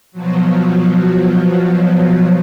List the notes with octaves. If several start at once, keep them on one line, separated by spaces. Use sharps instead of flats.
B2 F3 F#3